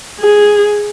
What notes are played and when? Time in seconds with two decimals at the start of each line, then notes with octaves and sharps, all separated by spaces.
0.20 G#4